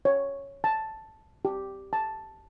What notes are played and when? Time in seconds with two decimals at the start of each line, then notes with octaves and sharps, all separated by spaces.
0.05 C#5
0.64 A5
1.45 G4
1.93 A5